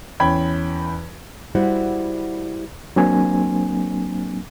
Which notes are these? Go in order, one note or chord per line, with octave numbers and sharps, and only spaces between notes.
E2 C#4 G5 B5 G#6
G3 E4 F#4 C5 F#5
F#3 A#3 C4 D4 G#5